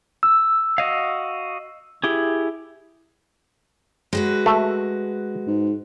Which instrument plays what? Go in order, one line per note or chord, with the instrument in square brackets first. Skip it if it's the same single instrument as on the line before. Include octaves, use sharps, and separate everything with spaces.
[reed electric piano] E6
[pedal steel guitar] F#4 D#5 F5
E4 G4 G#4
[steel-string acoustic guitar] G#3 F#4 B4
[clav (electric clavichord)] A3
[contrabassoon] G#2